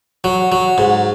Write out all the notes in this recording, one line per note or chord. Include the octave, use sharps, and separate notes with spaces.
F#3
F#3
G#2